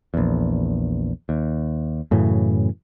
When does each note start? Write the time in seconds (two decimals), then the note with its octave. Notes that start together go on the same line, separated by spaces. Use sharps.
0.14 A#1 E2
1.29 D#2
2.11 F#2 A2 C#3 E3